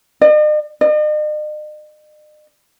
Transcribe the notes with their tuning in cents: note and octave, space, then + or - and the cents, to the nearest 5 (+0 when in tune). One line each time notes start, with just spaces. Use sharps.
D#5 -45
D#5 -45